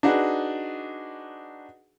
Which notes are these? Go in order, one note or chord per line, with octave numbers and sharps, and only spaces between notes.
D4 D#4 F#4 G#4 B4